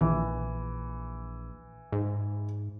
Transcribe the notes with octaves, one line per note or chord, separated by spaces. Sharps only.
A#1 E3
G#2